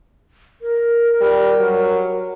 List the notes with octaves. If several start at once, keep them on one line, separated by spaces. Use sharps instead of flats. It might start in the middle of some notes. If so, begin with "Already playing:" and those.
A#4
G3
F#3